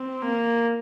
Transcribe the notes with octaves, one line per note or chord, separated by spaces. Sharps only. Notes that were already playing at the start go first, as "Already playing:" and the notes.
Already playing: C4
A#3